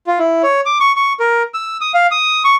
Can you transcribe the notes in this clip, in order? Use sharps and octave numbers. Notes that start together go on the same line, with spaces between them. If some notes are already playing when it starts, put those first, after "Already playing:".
F4
E4
C#5
D6
C#6
C#6
A#4
E6
D#6
F5
D#6
C#6